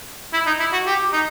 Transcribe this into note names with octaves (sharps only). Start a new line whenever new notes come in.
E4
D#4
E4
F#4
G4
D#4